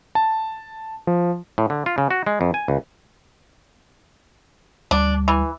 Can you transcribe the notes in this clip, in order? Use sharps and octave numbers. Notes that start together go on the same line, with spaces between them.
A5
F3
A2
D3
F4
C#3
F#4
G#3
F2
G#5
C#2
D2 G3 D4
E3